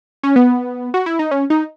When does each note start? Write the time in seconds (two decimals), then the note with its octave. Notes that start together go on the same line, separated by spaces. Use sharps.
0.23 C#4
0.36 B3
0.94 F#4
1.06 E4
1.19 D#4
1.31 C#4
1.50 D#4